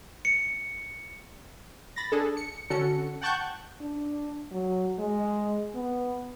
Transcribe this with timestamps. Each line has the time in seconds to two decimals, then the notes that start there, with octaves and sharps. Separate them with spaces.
0.25 C#7
1.96 B5 A6 A#6
2.12 D4 G#4 A4
2.37 C#7
2.70 D3 C#4 F#4 A4 C#7
3.21 F#5 G5 A5 C#6 F#6 G6
3.81 D4
4.52 F#3
4.99 G#3
5.75 B3